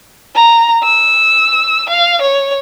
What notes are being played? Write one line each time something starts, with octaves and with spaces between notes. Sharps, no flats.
A#5
E6
F5
C#5